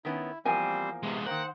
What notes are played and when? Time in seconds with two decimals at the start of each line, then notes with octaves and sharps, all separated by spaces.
0.05 D#3 B3 C#4 E4
0.45 E2 F3 G3 A#3 C4 C5 G#5
1.03 C3 G#3 B3
1.26 D#3 A#3 C5 F#5 G5 A#5